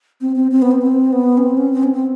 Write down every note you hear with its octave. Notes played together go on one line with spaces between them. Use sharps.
C4
C4
C4
B3
C4
C4
B3
C#4
C4
C#4
C4
C#4
C4